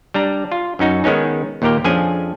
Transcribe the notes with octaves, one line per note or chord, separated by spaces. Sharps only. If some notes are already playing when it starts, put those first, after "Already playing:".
G3 D4 A#5
F4
F#2 C#4 D#4 F#4
D#3 G#3 B3 C#4 D#4
D#2 A#2 A#3 G4 A#4 G5
F2 F3 C#4 D4 G#4 G#5